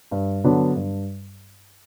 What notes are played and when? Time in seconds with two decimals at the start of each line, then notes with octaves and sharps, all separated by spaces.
0.11 G2
0.44 D3 F#3 B3 D4
0.76 G2